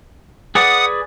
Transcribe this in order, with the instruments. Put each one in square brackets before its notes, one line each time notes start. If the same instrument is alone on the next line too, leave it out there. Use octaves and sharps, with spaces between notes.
[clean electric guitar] G#4 B4 D5 [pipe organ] F#5 D#6